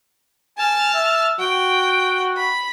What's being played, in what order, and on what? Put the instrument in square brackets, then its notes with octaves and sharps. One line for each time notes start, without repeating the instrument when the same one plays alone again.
[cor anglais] G#5 [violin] A5 F6
[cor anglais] E5
[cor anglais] F#4 [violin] G5
[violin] B5